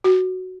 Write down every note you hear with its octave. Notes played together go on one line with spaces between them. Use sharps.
F#4